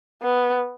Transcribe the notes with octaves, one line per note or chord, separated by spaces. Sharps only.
B3